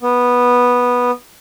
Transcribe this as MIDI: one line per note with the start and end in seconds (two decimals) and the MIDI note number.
0.02 1.11 59